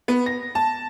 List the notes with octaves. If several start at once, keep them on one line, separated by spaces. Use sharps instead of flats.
B3
A#6
A5